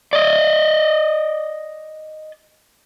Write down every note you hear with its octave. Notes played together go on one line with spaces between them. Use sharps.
D5 D#5